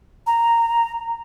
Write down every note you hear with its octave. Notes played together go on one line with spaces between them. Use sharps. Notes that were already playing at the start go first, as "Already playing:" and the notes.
A#5